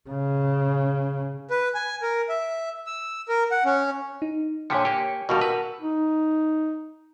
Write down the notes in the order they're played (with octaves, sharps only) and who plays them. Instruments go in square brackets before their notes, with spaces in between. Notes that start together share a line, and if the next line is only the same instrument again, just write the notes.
[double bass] C#3
[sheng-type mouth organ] B4
G#5
A#4
E5
E6
A#4
F#5
C#4
[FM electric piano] D#4
[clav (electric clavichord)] A#2 D3 F3 [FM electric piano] C#5 B6 C#7 [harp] G5 G#5
[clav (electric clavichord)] A#3 G4
[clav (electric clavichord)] B2 D#3 G3 [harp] F#4 A#4 A5 [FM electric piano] D#5 F5
[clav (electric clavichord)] B4 [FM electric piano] E6
[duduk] D#4